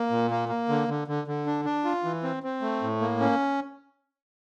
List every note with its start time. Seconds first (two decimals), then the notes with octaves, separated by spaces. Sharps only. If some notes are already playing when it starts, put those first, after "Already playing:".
Already playing: A#3
0.11 A#2
0.31 A#3
0.49 A#3
0.69 D3
0.88 D3
1.08 D3
1.27 D3
1.46 D4
1.65 D4
1.84 F4
2.04 E3
2.23 C4
2.43 C4
2.62 A3
2.82 A2
3.01 A#3
3.20 C#4